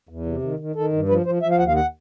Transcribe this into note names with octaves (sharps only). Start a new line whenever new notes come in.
E2
C3
D#3
D#3
D#3 A4
G2
F3 B4
F3 C5
F3 E5
F5
D#2 F#5
F5
F#5